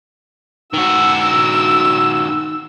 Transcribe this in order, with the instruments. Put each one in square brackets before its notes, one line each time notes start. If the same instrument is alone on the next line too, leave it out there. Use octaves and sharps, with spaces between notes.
[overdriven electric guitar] D#3 F#4 [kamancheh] E6